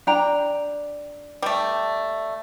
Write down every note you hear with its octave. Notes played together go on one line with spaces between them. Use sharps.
D4 G5 A#5
G3 A3